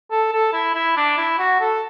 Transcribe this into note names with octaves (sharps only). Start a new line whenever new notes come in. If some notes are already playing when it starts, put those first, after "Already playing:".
A4
A4
E4
E4
D4
E4
F#4
A4